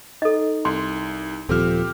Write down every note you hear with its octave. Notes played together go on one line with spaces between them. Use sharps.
D#4 A4 D#5
C2 C6
D#1 F3 C4 G4 A4 F6